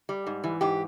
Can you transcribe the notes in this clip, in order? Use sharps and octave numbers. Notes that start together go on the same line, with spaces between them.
G3
G#2
E3
G#2 G4